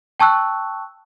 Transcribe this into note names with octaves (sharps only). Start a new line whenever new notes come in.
G5 A5 C#6 E6 F#6